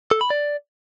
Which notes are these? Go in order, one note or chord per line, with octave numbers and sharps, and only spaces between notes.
A4
B5
D5